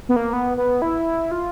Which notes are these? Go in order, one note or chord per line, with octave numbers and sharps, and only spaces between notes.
B3
A#3
B3
B3
E4
F4